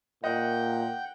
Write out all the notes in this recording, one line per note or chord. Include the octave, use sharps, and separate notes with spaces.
A#2 D#5 F#5 G5 G6